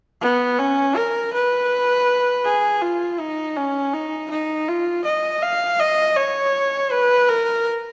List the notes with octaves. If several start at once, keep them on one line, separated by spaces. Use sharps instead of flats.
B3
C#4
A#4
B4
G#4
F4
D#4
C#4
D#4
D#4
F4
D#5
F5
D#5
C#5
B4
A#4